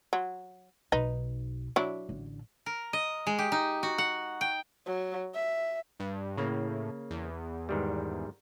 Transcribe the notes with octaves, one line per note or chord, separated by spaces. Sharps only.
F#3
B1 D#4 B4
F#3 D4 E4
A1 D3
A#4
D#5
G#3
G4
D#4
F#4
F#5
G5
F#3
E5
G2
A2 C#3 A#3
E2
G#2 D#3 G3